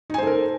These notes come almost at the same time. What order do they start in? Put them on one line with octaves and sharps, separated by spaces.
D#4 G#5 C5 A4 A#4